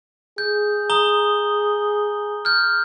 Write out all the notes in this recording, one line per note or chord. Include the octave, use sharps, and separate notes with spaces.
G#4 G6
A#5 D#6 G7
F6 G6